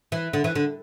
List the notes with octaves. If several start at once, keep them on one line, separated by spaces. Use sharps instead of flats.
E3
D3
E3
D3